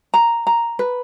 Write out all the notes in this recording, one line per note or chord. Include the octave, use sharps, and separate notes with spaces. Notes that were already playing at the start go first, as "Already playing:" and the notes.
A#5
A#5
B4